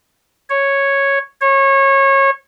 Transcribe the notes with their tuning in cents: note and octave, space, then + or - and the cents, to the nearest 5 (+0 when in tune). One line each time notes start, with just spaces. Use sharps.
C#5 -5
C#5 -25